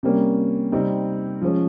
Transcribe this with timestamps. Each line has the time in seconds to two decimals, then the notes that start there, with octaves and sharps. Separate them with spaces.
0.03 C3 G3 A#3 C#4
0.72 C3 G3 C4 D#4
1.42 F3 G#3 C#4